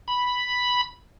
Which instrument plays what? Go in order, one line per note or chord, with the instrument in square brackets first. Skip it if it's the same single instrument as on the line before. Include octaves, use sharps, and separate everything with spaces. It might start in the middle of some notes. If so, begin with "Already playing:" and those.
[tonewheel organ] B5